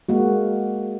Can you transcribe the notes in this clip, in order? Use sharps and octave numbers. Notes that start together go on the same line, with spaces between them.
G#3 A#3 F#4